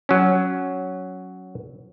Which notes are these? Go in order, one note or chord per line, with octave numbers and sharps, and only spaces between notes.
F#3 C#4